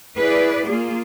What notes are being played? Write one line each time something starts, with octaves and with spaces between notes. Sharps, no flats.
E4 G#4 B4 D5
A#3 F4 G#4